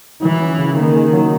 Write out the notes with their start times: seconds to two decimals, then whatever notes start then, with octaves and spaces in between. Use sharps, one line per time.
0.22 E3 F#3
0.40 C#4
0.58 C#3
0.77 D#3 A#3
0.95 G#4
1.13 F#3